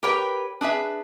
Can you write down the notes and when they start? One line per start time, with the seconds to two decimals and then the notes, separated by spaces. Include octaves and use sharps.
0.03 G4 A#4 B4 C#5 G5
0.61 D4 G#4 B4 E5